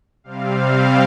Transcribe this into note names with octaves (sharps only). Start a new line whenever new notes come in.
C3 G3 C4 F5